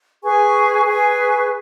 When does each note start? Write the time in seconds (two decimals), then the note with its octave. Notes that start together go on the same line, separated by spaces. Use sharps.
0.22 G#4 B4 G#5 C#6
0.85 G#4 B4 G#5 C#6